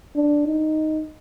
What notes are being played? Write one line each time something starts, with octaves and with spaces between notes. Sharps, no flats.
D4
D#4